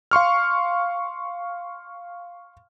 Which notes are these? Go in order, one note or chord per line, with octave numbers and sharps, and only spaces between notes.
F5 C6 C#6 F6